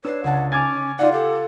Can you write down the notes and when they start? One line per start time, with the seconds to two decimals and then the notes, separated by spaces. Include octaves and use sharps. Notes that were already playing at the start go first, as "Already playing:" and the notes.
0.05 D4 B4 C#5 E6 C7
0.24 C#2 F#5 A5
0.52 C#4 D#4 G#5 D6 F6 G#6 A6
0.99 D#4 F4 D5 F#5
1.12 G4 A4